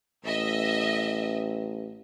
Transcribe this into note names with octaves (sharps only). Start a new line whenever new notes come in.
A1 D#5 E5